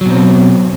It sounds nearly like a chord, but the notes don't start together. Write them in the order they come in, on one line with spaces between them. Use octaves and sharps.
F#3 B2 C4